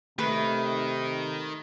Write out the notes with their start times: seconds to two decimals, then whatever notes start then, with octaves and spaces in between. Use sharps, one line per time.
0.19 C3 D#3 A3 B4